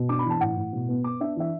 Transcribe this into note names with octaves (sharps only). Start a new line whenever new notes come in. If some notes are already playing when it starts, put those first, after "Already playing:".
Already playing: B2
D4 D6
B5
E3
A5
A2 F#5
A2
B2
B3
B3 D6
D4 E5
E3 E5